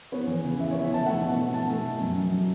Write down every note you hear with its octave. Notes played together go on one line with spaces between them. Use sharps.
B3 C#5
E2
C#3
E3 E5
B3 C#5
E5
E2 A5
A3 F#5
B2
A3
B2 A5
A3
B2
F#2
F#2
F#3